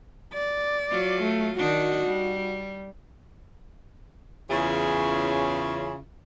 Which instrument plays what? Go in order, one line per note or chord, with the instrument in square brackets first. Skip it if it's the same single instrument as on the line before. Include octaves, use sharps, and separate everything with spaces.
[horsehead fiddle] D5
[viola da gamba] F#3 F4
[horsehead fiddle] A3
[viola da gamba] D#3 D4 D#4 [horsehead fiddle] F#4
[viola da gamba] G3
[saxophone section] E2 C#3 C#4 E4 F4 G#4